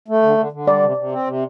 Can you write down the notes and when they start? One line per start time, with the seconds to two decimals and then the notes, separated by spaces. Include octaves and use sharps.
0.08 A3
0.23 D3
0.38 D3
0.52 D3
0.67 G3 D5
0.83 C3
0.97 C3
1.12 C4
1.27 C3